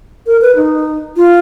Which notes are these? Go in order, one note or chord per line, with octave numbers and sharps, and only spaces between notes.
A#4
B4
D#4
F4